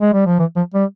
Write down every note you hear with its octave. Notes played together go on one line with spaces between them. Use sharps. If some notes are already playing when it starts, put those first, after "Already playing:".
G#3
G3
F3
E3
F3
G3